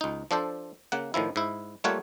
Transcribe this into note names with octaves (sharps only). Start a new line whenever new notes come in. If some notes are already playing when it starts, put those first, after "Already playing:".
C#2 D#4
F3 D4 A4 C5
C#3 A#3 F#5
A2 D#3 F3 E4
G#2 E4
G3 A3 A#3 F4 C#5 F#5